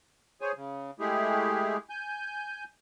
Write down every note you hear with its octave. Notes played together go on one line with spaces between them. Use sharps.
G#4 C5 C#5 G#5
C#3
G#3 A3 E4 G4 G#4
G#5 G6